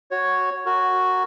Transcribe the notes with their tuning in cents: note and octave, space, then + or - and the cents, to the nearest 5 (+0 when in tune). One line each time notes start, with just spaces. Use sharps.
F#4 +0 C#5 +0
F#4 +0 A#4 -10